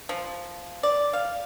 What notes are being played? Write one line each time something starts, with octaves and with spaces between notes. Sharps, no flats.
F3
D5
F5